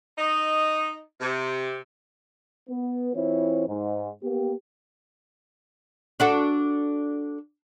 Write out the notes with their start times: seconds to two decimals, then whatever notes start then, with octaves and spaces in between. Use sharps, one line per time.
0.18 D#4 D#5
1.21 C3
2.68 B3 B4
3.14 E3 C4 E4 F4 C5 C#5
3.67 G#2
4.23 A#3 B3 G4
6.20 D4 F#4 A4